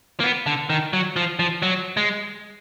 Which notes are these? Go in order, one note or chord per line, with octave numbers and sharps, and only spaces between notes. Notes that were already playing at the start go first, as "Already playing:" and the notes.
A#3
B3
D3
D#3
F#3
F3
F3
F#3
G#3